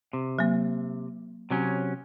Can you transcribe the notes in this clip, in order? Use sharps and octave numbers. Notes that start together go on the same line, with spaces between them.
C3
F#3 A#3
C3 F#3 C#4